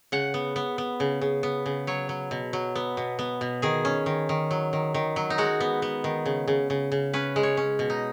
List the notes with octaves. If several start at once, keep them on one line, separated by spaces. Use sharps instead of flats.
C#3 F#5
B3
B3
B3
C#3
C#3
B3
C#3
F#3 C#5
F#3
B2
F#3
B3
B2
B3
B2
D#3 G#4
C#4
D#3
D#3
F#3
D#3
D#3
F#3
D#4
G#3 F#4
B3
B3
D#3
C#3
C#3
C#3
C#3
C#4 B4
G#3
C#5
C#4
B2
D#4